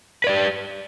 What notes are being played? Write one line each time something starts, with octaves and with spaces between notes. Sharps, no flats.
G4 B4 D5